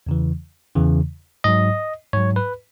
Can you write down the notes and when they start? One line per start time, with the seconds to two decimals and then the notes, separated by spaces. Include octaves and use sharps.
0.07 E2 C#3 E3
0.75 E2 C#3 E3
1.44 G#2 F#3 D#5
2.13 G#2 F#3 C#5
2.36 B4